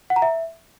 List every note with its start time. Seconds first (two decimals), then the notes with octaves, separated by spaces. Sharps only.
0.10 F#5
0.16 A#5
0.22 E5